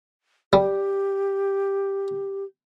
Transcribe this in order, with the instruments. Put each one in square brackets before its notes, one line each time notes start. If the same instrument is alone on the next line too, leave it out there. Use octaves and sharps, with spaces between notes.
[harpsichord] G3 [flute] G4